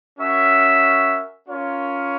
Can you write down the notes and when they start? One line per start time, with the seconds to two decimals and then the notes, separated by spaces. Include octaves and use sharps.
0.18 C#4 F#4 A#4 C#5 E5
1.49 C#4 F4 A#4 C#5